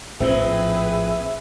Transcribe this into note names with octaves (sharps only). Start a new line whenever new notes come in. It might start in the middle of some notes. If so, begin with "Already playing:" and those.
A#1 A2 F3 C4 G#4 B4 E5